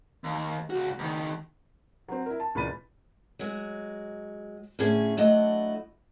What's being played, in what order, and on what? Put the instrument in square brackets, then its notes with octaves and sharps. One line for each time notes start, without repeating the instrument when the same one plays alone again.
[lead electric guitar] D#2
C#2 F#4
C#2 D#3
[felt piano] F#3 C4
E4 A#4
A5
C#2 A#2 E3 B5 A6 D#7
[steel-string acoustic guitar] F#3 G#3
A2 D3 C#4 G#4 E5
F#3 A3 D4 E4 D#5 F#5